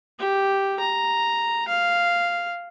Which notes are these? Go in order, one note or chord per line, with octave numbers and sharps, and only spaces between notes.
G4
A#5
F5